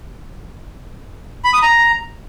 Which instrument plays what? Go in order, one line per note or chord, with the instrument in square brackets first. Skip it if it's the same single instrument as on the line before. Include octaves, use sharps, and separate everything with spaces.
[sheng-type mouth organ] B5
D#6
A#5